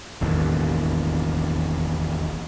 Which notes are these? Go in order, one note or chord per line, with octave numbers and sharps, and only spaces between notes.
E1 A1 D#2